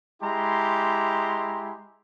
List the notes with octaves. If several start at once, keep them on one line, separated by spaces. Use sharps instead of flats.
G#3 E4 G4 A#5 C6